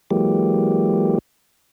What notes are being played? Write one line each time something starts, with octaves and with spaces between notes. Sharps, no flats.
E3 F#3 G#3 A#3 G4